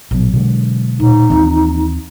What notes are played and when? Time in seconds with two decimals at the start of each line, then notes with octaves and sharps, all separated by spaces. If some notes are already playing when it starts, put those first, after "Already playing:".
0.11 A#1 B2 F#3
0.33 B2 D3 G#3
1.00 A#2 D#4
1.30 D#2 E3 A#3 C4 F4